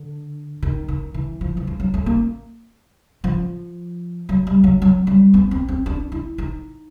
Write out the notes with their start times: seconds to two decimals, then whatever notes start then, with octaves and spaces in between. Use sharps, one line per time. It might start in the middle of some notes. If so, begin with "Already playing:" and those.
Already playing: D3
0.63 D#3
0.88 D#3
1.14 E3
1.41 F3
1.57 E3
1.67 F3
1.80 F#3
1.94 A3
2.06 A#3
3.24 F3
4.29 F#3
4.47 G3
4.64 F#3
4.82 F#3
5.07 G3
5.34 B3
5.51 C4
5.69 C4
5.86 D4
6.12 E4
6.38 D#4